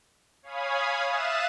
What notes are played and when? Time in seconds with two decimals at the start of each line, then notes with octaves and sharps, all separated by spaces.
0.43 C#5 F5 G#5 B5 D#6 G#6
1.07 E5 F5 D#6 F#6 A6 E7